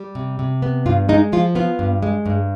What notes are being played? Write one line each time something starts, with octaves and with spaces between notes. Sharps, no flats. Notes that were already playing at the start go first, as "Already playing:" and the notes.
Already playing: G3
C3
C3
B3
G2 F4
G#3 D#4
F3 F4
B3 F4
G2
G#3
G2